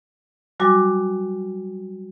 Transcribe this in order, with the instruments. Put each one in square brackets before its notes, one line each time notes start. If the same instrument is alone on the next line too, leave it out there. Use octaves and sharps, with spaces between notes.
[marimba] F#3 G3 F#4 G#5 D6